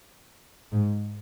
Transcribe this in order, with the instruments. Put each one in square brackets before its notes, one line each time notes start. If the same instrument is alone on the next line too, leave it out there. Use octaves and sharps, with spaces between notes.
[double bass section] G#2